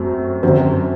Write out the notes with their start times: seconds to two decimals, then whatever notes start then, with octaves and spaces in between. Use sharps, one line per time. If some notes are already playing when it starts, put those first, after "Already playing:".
Already playing: F#2 F#3 A3 C4
0.43 F#2 D3 F#3 C4